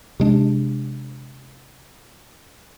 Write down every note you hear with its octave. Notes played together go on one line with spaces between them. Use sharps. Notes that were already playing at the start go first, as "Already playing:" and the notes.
C3 G#3 D4